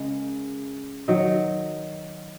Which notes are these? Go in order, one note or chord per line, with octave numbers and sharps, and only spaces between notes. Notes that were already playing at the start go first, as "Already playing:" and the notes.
Already playing: C#3 G#3 A#4
D#3 F#3 D#4